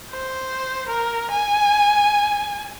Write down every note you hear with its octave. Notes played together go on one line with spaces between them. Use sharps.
C5
A#4
G#5